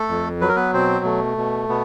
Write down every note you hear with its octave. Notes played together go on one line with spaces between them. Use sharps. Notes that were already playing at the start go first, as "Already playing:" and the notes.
Already playing: A3 A4
F2
F#3 B4
A#4
B3 B4
B2 C4 C5
A3
B2
B2 B3